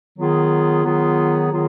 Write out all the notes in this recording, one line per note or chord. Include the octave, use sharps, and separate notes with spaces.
D#3 F#3 B3 F4 G#4
D#3 F#3 B3 F4 G#4
D#3 F#3 B3 F4 G#4